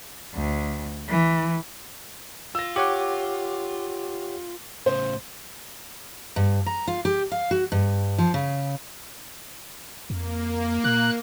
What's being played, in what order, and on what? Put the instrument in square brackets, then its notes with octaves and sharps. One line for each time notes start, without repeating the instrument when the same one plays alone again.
[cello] D2
E3
[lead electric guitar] F4 [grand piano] E6 A#6
[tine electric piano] G4 C#5 F#5 [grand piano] D6
[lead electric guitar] A2 C#3 [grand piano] C5
[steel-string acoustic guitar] G2
A#5
F4
G4
F5
F#4
G2
F3
C#3
[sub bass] F2 [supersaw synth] A#3
[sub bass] A#2 [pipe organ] F#6